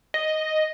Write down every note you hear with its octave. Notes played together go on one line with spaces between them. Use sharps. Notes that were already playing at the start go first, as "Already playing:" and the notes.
D#5